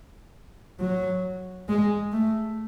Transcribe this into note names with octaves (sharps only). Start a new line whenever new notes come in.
F#3
G#3
A3